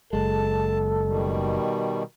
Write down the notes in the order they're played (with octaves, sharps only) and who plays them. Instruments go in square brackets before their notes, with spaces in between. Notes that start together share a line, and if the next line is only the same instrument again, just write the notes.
[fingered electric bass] F#1 G#3 [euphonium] A4 [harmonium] A5
[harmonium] B2 D#3 G3